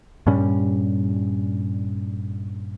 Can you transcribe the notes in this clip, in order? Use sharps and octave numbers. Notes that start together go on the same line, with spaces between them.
G2 A#2 G3 C#4